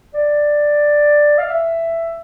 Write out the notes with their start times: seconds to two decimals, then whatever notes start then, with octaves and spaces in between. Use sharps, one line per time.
0.14 D5
1.38 F5
1.49 E5